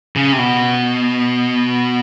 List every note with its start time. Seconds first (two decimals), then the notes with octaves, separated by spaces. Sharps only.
0.16 C#3
0.32 C3
0.39 B2